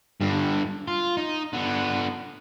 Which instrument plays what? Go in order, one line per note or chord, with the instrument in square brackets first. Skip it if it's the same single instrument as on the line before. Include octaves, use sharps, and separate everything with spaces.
[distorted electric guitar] G2 D3
F4
D#4
D3 B3